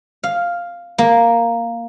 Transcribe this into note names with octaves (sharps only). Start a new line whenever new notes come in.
F5
A#3